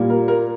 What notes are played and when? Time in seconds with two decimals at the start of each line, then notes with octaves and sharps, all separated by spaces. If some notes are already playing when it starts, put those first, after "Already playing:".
Already playing: A#2 G3 A#3
0.10 A#4
0.28 A#4